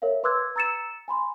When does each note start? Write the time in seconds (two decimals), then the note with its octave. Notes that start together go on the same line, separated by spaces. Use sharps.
0.02 A#4 C#5 E5 F5
0.23 B4 C6 D6 E6 F#6 G#6
0.56 A#5 E6 A6 C#7 E7
1.08 G#5 B5 C6